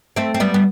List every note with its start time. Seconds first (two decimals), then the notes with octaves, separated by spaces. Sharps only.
0.16 A3 C4
0.34 C4
0.40 G3 B3
0.54 B3